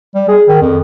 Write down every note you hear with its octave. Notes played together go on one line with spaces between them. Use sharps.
G3
G#4
D#3
F2